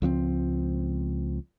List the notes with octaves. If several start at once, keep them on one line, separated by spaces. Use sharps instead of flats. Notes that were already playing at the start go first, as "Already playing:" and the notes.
C#2 F3 A3 C4